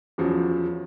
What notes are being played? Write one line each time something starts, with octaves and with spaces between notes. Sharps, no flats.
E2 C#3 F3 F#3